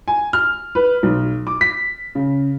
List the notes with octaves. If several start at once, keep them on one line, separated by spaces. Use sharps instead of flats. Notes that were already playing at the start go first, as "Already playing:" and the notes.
G#5
F6
B4
B1
D6
B6
C#3